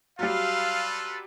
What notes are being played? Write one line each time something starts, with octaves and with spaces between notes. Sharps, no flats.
F#3 G3 F4 A4 B4 F5